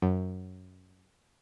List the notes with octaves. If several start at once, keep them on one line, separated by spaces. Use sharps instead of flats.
F#2